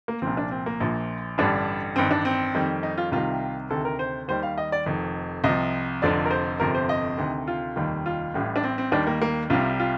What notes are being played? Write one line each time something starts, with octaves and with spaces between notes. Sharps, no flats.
A#3
C2 A#2 F3 C4
D4
C4
A#3
A#1 A#2 F3
A1 G2 D3 G3 D4
A1 G2 D#3 C4
D4
C4
F2 D#3 G3
D#4
F4
C2 C3 D#3 G3 F4
D2 C3 D#3 A4
A#4
C5
D#2 D#3 G3 C5
F5
D#5
D5
F1 F2 D#3
C2 C3 F3 D#5
F1 F2 D3 F3 D5
A#4
C5
G1 F2 C3 F3 A#4
C5
D#5
D2 C3 D#3
F4
F1 D#2 D#3 G3
F4
A1 A2 G3
D4
C4
C4
D#2 D#3 G3 D4
A#3
A#3
C2 C3 G3 F4
F4